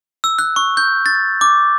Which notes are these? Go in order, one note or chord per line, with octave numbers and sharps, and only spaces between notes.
E6
F#6
C#6
G6
A6
D6